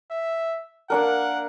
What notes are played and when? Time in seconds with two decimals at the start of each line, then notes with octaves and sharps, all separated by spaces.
0.11 E5
0.90 A#3 D4 A#4 F#5